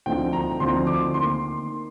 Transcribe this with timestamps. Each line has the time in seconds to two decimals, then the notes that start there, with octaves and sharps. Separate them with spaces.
0.06 D2 D3 F3 C4 D#4 G5
0.33 A#5
0.60 D2 D3 F3 C4 D#4 C6
0.87 D6
1.14 D#3 A#3 C6